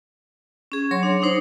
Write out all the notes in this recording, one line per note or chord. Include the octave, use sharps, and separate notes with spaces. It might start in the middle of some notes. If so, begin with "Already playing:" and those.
C#4 G#4
F#3 C#5 C6
D4
D4 D#4 C5 C#5